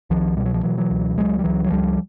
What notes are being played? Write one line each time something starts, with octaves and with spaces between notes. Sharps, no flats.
C2 D#3 F3
B2 G3
F#3
F3
B2 E3 F#3
E3 F#3
C#2
C#2 F#3 G#3
G3
C#2 E3 F#3
F#3
C#2 F3 G3